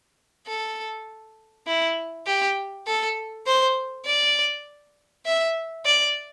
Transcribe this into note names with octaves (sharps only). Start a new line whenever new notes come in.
A4
E4
G4
A4
C5
D5
E5
D5